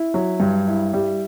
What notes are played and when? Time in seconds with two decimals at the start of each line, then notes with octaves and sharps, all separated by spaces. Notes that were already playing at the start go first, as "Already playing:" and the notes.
Already playing: E4
0.14 F#3
0.40 G2
0.68 E4
0.93 G3